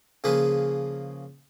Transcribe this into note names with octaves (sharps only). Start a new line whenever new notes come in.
C#3 F3 A#3 G#4 B4